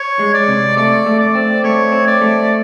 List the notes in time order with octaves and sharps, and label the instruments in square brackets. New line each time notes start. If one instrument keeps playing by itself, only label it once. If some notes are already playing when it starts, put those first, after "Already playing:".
Already playing: [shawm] C#5
[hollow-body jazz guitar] G#3
[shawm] D5
[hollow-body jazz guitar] C3
[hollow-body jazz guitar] A3 [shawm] D5
[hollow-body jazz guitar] A3
[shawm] D5
[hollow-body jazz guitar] C4
[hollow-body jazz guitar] A3 [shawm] C#5
[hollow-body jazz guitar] C4
[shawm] D5
[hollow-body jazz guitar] A3